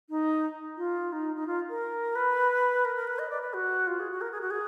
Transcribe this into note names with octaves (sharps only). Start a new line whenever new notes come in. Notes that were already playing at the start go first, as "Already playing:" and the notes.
D#4
F4
D#4
D#4
F4
A#4
B4
A#4
A#4
B4
D#5
D5
B4
F#4
F4
G#4
F#4
A#4
G#4
F#4
G#4